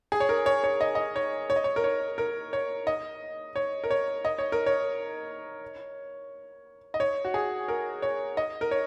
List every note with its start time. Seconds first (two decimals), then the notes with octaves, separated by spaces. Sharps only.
0.12 G#4
0.20 C#5
0.29 A#4
0.46 C#5
0.64 C#5
0.81 D#5
0.95 D#5
1.16 C#5
1.50 C#5
1.56 D#5
1.64 C#5
1.76 A#4
1.84 C#5
2.18 A#4
2.53 C#5
2.87 D#5
3.56 C#5
3.84 A#4
3.90 C#5
4.25 D#5
4.38 C#5
4.52 A#4
4.66 C#5
6.94 D#5
7.00 C#5
7.25 F#4
7.34 G#4
7.68 A#4
8.02 C#5
8.37 D#5
8.61 A#4
8.71 C#5